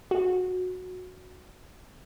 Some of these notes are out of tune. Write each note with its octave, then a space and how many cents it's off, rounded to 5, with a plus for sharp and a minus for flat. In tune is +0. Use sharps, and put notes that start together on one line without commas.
F#4 -15